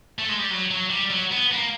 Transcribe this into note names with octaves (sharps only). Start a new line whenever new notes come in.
A3
G#3
G3
F#3
F#3
G3
F#3
B3
A#3